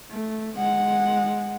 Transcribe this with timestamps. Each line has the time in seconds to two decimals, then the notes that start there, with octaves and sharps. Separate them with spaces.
0.11 A3
0.57 G#3 F#5